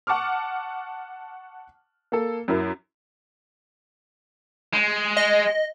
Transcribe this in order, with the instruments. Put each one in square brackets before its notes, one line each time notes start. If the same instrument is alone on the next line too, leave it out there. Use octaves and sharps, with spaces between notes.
[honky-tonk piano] F#5 A5 C#6 D6 F6
A#3 A4
F#2 E4 A#4
[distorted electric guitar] G#3
[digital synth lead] D#5